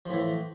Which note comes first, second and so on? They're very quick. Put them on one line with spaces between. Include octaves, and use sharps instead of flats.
F3 A2 E3